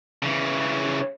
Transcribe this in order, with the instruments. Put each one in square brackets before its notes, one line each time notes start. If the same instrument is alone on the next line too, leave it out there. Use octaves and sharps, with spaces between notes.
[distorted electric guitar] C#3 E3